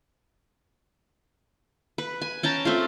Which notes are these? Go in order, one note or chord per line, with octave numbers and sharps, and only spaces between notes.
B4
G#5
C#4 G5 A5 A#5
A3 C4 F4